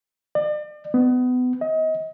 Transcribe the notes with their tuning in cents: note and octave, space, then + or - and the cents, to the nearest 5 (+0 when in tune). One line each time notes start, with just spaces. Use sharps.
D5 +40
B3 +25
D#5 +30